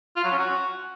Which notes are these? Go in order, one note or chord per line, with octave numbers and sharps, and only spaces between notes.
F4
F#3
C#4
F#4